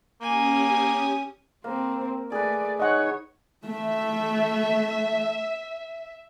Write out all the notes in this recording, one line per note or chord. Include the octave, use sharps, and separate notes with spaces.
A#3 C#4 G4 G#5 D#6
A#3 C4 C5
A3 G#4 B4 D5
D#4 C#5 D#5 F#5
A3 E5